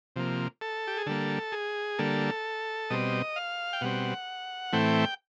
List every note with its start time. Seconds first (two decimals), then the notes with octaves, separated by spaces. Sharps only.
0.16 C3 F3 A#3
0.61 A4
0.87 G4
0.98 G#4
1.06 D3 G3 A#3 A4
1.52 G#4
1.99 D3 G3 A#3 A4
2.90 B2 G3 C4 D#5
3.36 F5
3.73 G5
3.81 B2 G3 C4 F#5
4.73 A2 E3 A3 C4 G5